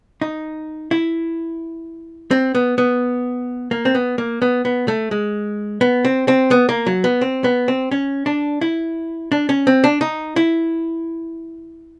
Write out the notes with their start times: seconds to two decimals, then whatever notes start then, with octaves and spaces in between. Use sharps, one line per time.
0.22 D#4
0.91 E4
2.31 C4
2.55 B3
2.78 B3
3.71 A#3
3.85 C4
3.95 B3
4.18 A#3
4.42 B3
4.65 B3
4.88 A3
5.11 G#3
5.81 B3
6.05 C4
6.28 C4
6.51 B3
6.69 A#3
6.87 F#3
7.04 B3
7.21 C4
7.44 B3
7.68 C4
7.91 C#4
8.26 D4
8.61 E4
9.32 D4
9.49 C#4
9.67 C4
9.84 D4
10.01 D#4
10.36 E4